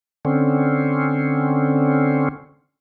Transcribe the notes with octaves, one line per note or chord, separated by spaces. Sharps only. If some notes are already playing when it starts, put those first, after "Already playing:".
D3 C4 C#4